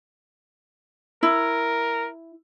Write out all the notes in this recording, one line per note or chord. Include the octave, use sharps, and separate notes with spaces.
E4 A#4